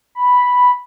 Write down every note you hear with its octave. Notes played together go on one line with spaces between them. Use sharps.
B5